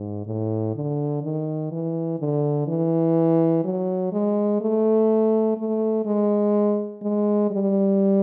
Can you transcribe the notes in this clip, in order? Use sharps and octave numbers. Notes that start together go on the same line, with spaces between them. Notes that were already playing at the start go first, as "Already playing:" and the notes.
Already playing: G#2
A2
D3
D#3
E3
D3
E3
F#3
G#3
A3
A3
G#3
G#3
G3